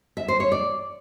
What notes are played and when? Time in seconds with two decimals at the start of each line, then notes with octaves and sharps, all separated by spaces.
0.17 E5
0.28 C5
0.40 C#5
0.52 D5